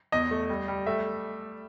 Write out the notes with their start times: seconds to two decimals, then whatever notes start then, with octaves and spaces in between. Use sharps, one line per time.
0.12 E2 D#5
0.31 A3
0.50 G3
0.68 G3
0.86 A3 E5